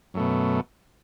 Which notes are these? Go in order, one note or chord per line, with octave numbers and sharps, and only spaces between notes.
F#2 B2 A3